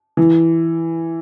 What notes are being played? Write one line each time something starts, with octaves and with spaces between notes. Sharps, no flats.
E3